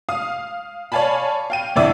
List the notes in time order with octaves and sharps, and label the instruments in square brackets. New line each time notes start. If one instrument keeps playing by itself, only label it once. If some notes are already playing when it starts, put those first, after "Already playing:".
[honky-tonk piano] F5 D#6
C#5 D5 F5 G#5 A5 B5
F5 G5 D#7
G1 F2 E4 D5 D6 E6